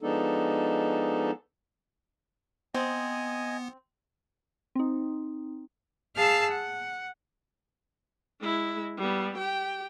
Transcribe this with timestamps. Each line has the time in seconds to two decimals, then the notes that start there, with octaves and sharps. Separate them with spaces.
0.03 F3 G#3 B3 D4 D#4 A4
2.75 B3 C4 D#5 G#5
4.75 C4 D#4
6.17 G#4 F5 A5 E6 F6
6.53 F#5
8.41 G#3 E4
8.97 G3 B3
9.38 G4 G5